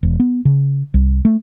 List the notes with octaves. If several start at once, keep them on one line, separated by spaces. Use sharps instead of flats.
E1
B3
C#3
C2
A3